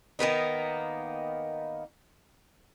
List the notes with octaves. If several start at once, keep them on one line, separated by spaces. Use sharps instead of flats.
D#3 A#3 B3 D#4